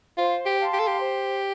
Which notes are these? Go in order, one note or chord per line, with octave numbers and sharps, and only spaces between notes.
F4 C5
G4
F5 A5 C6
G4
A4
G4
C5